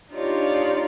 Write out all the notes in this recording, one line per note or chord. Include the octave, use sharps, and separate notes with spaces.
D4 D#4 F4 G4 C#5 D5